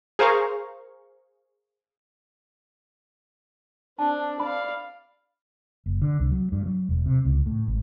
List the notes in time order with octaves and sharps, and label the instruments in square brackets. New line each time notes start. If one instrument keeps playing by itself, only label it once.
[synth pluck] G#4 A#4 C5 F5 A#5 C#6
[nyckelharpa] C4 D4 [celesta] A5
[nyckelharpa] D5 F5 [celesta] B5
[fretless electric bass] F#1
D3
C2
F#3
G2
F#3
E1
C3
C#2
A2
G#1